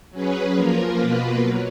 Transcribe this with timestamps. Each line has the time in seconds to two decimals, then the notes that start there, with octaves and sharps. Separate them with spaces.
0.11 F#3 C#4 G#4 B4
0.54 F3 A#3 F4 A#4
0.96 B2 A#3 F4 B4
1.39 F#3